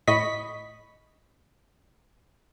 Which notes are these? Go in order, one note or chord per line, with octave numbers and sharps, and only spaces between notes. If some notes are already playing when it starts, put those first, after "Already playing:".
A2 D#5 B5 C#6 B6